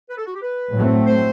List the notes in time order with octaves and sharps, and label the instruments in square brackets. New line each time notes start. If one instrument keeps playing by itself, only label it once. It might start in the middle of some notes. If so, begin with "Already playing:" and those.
[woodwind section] B4
A4
F#4
G4
B4
[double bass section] A2 F#3 A3 C4
[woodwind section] C5